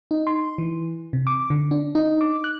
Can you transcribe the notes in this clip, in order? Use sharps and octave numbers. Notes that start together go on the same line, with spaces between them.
D#4
C6
E3
C3
D6
D3
D4
D#4
D6
F#6